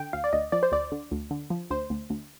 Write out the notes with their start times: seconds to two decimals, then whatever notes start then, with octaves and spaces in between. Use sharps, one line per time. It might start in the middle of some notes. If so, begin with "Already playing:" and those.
Already playing: D3 G5
0.13 D2 F5
0.24 D5
0.33 D2 D#5
0.52 F3 D5
0.63 C5
0.72 D2 D5
0.92 D3
1.11 D2
1.31 D3
1.50 F3
1.70 D2 C5
1.90 D2
2.10 D2